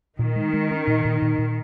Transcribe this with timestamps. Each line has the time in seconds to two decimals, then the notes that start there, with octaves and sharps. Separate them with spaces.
0.19 A#2 D#3
0.36 G#3
0.53 G#3
0.71 C#4
0.87 A#2
1.05 A#2
1.22 A#2
1.38 A#2